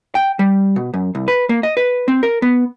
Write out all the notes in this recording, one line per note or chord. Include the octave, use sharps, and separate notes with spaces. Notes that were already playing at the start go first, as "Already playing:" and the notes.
G5
G3
B2
F#2
C2
B4
A#3
D#5
B4
C4
A#4
B3